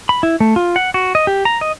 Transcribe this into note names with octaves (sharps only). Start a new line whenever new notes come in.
B5
E4
A3
F4
F#5
F#4
D#5
G4
A#5
D#5